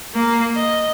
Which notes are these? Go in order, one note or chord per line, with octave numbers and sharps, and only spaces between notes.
A#3
D#5